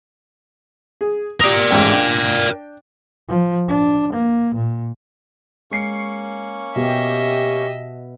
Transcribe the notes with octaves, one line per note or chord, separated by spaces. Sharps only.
G#4
G4 A#4 D5 D#6
A1 G#2 G5
D4 G5
F3
D4
A#3
A#2
G#3 A#3 C#4 C#6 C7 C#7
B2 G4 D#5 E5